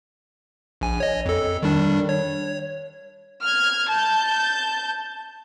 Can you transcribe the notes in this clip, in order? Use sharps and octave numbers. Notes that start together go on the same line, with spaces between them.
A#1 G#5
C#5 D#5
F2 A4
D#3 G3 D4
C#5
F6 G#6
A5 G6